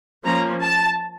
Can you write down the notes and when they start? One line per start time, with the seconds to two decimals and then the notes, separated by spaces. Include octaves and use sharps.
0.25 F3 A#3 C#4 A#5
0.63 A5